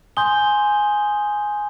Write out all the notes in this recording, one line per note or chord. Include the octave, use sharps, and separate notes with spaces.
G#5 C6 D#6 G6 G7